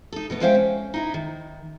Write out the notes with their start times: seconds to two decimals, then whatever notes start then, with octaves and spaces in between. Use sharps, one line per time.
0.12 D#4 A4
0.30 B2 A3 B3
0.41 G#3 C#4 C5 E5 F5 G5
0.55 C#4
0.94 D#4 E4 D#5
1.14 D#3